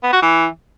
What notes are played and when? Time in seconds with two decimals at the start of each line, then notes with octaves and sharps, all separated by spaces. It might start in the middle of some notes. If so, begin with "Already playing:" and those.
0.03 B3
0.13 F#4
0.22 E3